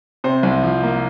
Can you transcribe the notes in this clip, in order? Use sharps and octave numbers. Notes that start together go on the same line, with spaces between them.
C3 C5
C2
F3
A#3